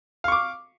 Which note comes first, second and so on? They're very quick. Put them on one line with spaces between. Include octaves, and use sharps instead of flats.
F5 C#6 D6